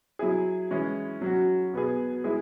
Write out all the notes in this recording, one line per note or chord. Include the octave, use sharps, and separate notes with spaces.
F#3 E4 G#4
E3 G#3 C#4 E4
F#3 C#4 F#4
B2 B3 G#4
G#3 E4 G#4